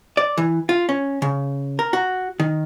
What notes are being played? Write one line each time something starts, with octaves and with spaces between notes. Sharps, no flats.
D5
E3
F4
C#4
C#3
A#4
F#4
D#3